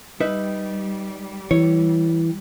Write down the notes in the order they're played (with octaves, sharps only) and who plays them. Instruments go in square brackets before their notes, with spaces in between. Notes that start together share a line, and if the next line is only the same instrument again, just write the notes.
[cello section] G3 [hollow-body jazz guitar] D#4 B4 E5
[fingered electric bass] E3 [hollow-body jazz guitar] C#5